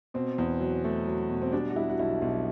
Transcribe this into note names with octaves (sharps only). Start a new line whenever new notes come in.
B2 C4
E2
F#3
A3
F#3
B2
C4
G3 D4
F#4
G3 E4
F#4
B1 E4
B1